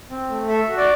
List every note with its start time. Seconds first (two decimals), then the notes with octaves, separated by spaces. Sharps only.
0.10 C4
0.30 A3
0.48 A4 E5
0.68 F#4
0.77 D5